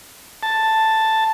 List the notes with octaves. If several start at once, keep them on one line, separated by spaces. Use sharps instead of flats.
A5